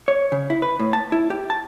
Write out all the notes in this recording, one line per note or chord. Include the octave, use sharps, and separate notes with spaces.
C#5
C#3
E4
B4
A2
A5
E4
G4
A5